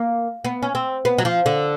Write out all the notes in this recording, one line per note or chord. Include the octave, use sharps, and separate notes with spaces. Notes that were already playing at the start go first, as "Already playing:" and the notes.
Already playing: A#3
B3
C#4
C4
B3
F#3
F3
D3